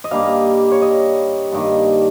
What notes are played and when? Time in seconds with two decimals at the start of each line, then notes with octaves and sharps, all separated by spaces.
0.04 D#5
0.11 G2 G3 A#3 F5
0.72 C#5
0.82 D#5
1.52 G2 D#3 A#3